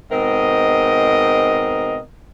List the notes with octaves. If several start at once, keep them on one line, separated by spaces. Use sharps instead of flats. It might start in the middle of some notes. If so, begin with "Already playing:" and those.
G#2 B2 C4 A#4 D#5